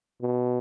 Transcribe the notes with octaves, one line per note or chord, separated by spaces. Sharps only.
B2